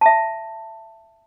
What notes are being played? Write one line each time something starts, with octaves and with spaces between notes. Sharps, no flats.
E5 A5